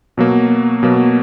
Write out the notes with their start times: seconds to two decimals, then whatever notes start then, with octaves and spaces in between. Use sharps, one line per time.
0.17 B2 F#3 A#3
0.83 B2 F#3 A#3